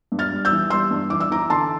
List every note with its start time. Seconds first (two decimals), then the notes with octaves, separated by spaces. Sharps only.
0.12 G2
0.19 F6 A6
0.32 G3
0.45 E6 G6
0.51 E3
0.70 G3 C6 E6
0.91 G2
1.10 E3 D6
1.20 E6
1.30 E3 A#5 D6
1.50 D3 A5 C6